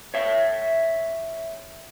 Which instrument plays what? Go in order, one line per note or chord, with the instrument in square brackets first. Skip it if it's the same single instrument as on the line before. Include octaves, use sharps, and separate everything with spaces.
[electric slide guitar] C#5 E5